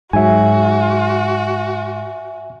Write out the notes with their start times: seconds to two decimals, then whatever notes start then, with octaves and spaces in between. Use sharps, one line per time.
0.13 G#2 F#3 F#4 E5 G#5